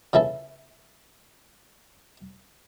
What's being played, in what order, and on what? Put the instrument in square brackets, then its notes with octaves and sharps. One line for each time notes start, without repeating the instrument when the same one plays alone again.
[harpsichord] C#3 E3 E4 A4